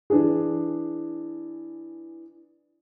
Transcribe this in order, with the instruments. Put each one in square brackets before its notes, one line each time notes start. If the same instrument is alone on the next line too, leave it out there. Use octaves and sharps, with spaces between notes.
[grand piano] E3 D4 G#4